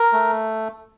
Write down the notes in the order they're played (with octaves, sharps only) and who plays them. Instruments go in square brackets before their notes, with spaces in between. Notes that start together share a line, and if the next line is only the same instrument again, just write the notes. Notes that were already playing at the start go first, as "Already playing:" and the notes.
Already playing: [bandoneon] A#4
A3